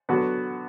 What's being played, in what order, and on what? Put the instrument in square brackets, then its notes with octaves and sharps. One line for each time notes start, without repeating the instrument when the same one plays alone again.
[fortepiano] D3 F#3 B3 F#4